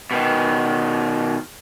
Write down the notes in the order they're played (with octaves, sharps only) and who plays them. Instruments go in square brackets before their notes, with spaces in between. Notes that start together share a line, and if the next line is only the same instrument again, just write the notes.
[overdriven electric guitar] B2 D#3